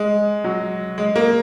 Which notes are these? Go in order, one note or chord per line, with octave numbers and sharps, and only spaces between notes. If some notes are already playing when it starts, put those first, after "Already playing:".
Already playing: G#3
F#3
G#3
A#3